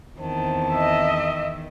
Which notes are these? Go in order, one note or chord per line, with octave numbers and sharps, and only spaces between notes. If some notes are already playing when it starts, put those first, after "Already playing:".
E2 D#3 C4 C5 A5
D#5 E5